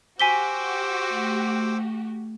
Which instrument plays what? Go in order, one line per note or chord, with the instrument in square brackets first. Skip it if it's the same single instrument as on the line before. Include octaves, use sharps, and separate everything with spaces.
[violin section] F#4 G4 [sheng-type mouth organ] C5 D6 E6 [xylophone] G#5 B6 G7
[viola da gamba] A3